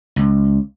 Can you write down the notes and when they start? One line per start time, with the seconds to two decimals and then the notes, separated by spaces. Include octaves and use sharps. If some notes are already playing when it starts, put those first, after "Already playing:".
0.16 C#2